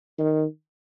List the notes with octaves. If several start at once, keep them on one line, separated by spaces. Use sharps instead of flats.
D#3